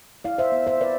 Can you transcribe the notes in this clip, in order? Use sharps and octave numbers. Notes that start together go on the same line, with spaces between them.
E4 D5 F5
C5 E5
B3
C5 E5
E4 B4 D5